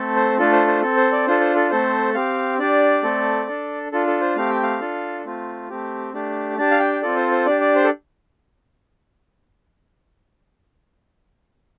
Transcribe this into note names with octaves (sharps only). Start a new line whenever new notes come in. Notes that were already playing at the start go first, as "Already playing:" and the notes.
Already playing: A3 C4 A4
C5
A3 D4 F4 A4
C5
C5
C4 A4
C5
D5
D4 F4 A4 C5
C5
A4
A3 C4 A4 C5
C4 G4 F5
D4 G4 D5
A3 C4 A4
D4 A4
D4 F4 A4
A4
C5
A3 C4 G4 F5
G5
F5
D4 F4 A4
A3 C4 F4
A3 C4 G4
A3 D4 G4
D4 G4 A5
F5
G5
C4 F4 A4 D5
C5
C5
D4 G4 D5
D5
C5
A4